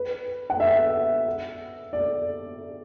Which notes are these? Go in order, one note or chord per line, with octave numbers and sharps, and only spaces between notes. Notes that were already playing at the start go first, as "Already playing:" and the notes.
Already playing: B4
F#5
E5
D5